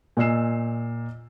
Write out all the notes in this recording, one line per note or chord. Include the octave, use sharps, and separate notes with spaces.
A#2 D#5 G#5 E6 C7 E7